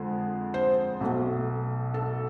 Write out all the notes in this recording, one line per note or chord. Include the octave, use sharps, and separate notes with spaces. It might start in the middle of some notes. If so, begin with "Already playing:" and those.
Already playing: F2 D3 G#3
C5
B1 B2 A3
A4